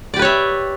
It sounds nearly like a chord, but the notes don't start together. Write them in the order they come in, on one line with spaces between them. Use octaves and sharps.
D5 G4 B4 C#5 E5